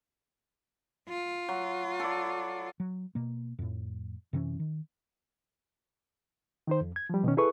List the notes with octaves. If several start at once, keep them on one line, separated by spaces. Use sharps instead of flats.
F4
F#3
A4 D5
F#3
B2 A#3
F2 A2
F#2 C3 E3 C#4
D#3
D#3 D#4 C5
F2
G#6
F3 G3
B2 D#3 C#4
E4 G#4 A4 B4 C#6